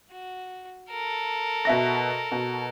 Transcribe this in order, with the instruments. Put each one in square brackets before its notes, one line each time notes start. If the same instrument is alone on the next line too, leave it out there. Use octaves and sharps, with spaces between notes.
[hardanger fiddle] F#4
A4 A#4
[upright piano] B2 E5 A#6
B2